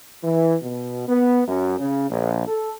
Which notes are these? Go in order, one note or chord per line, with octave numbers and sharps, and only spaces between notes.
E3
B2
B3
F#2
C#3
A#1
A4